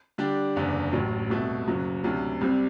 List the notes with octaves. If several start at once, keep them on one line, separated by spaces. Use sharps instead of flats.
D3 G3 D4 G4
F#1 E2 D3
A1 A2 F#3
C2 B2 A3
F#1 F#2 F#3
D2 C3 F#3
C2 C3 G3 C4